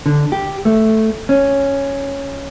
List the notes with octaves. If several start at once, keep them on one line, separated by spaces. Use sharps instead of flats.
D3
G4
A3
C#4